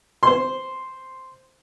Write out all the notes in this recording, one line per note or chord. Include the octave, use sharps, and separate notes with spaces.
C5 C6